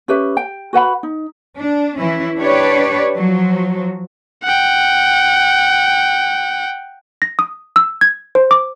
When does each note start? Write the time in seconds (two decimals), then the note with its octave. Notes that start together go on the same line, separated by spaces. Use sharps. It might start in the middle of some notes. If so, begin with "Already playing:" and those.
0.08 C#4 G4 B4 E5
0.37 G5
0.73 F#4 B4 F#5 B5
1.03 D#4
1.58 D4
1.97 E3 C#4 E4
2.38 D4 G4 B4 C#5 D5
3.17 F3 F#3
4.43 F#5 G5
7.22 A#6
7.39 D#6
7.76 E6
8.01 G#6
8.35 C5
8.51 D6